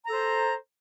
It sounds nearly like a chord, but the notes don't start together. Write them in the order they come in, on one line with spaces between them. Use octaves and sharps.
A#5 A4 C5